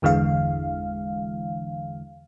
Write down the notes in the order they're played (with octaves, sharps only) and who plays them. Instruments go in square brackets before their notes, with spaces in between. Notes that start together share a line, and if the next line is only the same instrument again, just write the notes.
[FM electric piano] G1 E2 D3 E3 G#3 F5